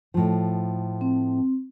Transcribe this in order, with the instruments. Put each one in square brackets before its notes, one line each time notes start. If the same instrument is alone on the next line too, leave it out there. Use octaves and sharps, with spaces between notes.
[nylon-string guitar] A2 F3
[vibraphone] C4